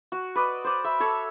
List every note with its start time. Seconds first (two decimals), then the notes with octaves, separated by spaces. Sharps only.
0.12 F#4
0.35 B4 D5 D#5
0.64 C5 D5
0.84 E5 B5
1.00 A4 C#5 A5